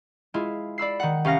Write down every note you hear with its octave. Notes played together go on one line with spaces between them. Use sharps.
G#3 E4 F4
D5 B5 E6 C7
D#3 F#5
C2 C#4 F5 A#6 C#7